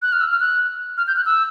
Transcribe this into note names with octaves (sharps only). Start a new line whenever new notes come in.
F#6
F6
E6
F6
F#6
F6
G6
F#6
E6